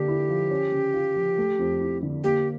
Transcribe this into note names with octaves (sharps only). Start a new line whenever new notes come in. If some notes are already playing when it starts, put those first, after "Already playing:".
Already playing: D3 A#3 G4
E4
F3
C#4
C#3
F4
F3
A3
F2
E4
D3
A#3 G4